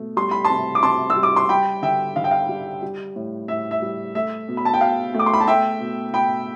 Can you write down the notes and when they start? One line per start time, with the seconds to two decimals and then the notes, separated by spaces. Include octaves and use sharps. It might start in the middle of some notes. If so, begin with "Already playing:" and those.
Already playing: B2 A3
0.17 G3 C6
0.31 B5
0.45 A5 C6
0.50 C3
0.75 D6
0.83 C3 A5 C6
1.10 E6
1.16 G3
1.23 D6
1.36 C6
1.49 G3 G5 B5
1.82 D3 E5 G5
2.16 D3 F5
2.24 G5
2.31 F5
2.49 G3
2.82 G3
3.16 A2
3.48 A2 E5
3.71 E5
3.82 G3
4.15 A3 E5
4.48 B2
4.57 B5
4.65 A5
4.73 G5
4.81 B2 F5
5.14 A3 D6
5.26 C6
5.34 B5
5.40 A5
5.47 A3 E5 G5
5.80 B2
6.14 B2 G5 B5